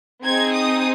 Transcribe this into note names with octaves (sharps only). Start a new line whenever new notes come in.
C4 D#4 G#4 G#6
D#6